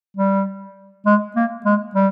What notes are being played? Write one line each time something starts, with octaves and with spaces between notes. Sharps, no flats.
G3
G#3
A#3
G#3
G3